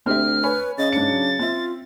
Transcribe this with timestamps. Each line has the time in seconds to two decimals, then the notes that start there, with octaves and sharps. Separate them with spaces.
0.06 D2 C4 G4 E5 F6
0.43 B4 C#5 G#5 B5
0.78 C#3 D#5 A6
0.92 G#2 D4 C#7
1.08 F#3
1.39 C4 F4 E5